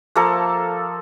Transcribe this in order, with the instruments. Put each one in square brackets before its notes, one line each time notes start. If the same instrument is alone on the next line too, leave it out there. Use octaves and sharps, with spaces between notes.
[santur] F3 A#3 A4 A#4